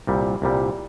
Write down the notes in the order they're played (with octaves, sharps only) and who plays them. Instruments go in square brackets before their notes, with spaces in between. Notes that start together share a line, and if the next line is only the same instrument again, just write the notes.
[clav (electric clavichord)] C2 A#2 G3
C2 A#2 G3